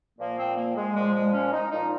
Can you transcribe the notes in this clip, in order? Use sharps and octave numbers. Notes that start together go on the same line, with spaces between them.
A#2 F3 A#3
C4
A#3
G#3
A#2 F3 G#3
G#3
C#4
D#4
A#2 F3 D#4